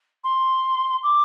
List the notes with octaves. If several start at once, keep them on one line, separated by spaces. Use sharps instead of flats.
C6
D6